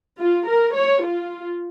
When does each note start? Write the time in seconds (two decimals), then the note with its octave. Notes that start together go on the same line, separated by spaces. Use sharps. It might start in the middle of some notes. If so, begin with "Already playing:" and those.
0.18 F4
0.47 A#4
0.76 C#5
1.05 F4